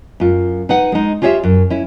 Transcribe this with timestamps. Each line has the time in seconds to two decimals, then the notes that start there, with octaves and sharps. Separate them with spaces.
0.20 F#2 F4
0.69 D#4 B4 F#5
0.92 G#3 D#4
1.22 F4 G4 G#4 C#5 D#5 E5
1.43 F#2
1.70 C#4 E4